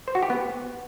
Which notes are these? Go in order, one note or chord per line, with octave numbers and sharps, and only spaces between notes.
C5
F#4
G4
B3